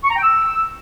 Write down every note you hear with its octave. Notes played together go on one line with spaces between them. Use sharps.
C#6
A#5
G5
E6